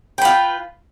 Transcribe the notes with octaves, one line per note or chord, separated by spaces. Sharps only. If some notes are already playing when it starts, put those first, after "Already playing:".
F4 B4 G5